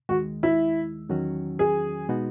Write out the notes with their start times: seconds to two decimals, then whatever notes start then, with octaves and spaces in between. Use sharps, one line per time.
0.09 D#2 D#3 G#3 F#4
0.43 E4
1.09 E2 D#3 F#3 C#4 F#4
1.59 G#4
2.09 B2 G#3 B3 D#4 F#4